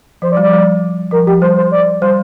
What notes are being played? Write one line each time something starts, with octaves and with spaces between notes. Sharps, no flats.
F3 C5
D5
G3
F3 D5
G3
F3 A#4
F3 G4
G3 C5
C5
D5
G3 C5